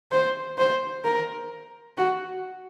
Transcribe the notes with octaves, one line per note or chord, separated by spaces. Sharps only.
C5
C5
A#4
F#4